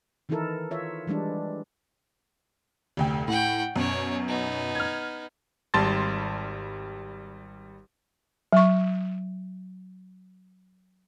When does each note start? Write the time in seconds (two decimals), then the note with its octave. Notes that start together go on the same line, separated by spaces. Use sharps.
0.29 D#3 E3 D#4 E4 A4 A#4
0.71 F4 C#5 E5
1.07 E3 G3 G#3 D4
2.97 F1 D2 G5
3.28 A2 F#5 G5
3.76 F#2 B2 C#5 D5
4.29 B3 D#4
4.75 F6 G#6
5.74 G#1 G3 A5 C6 A6
8.53 F#3 C#6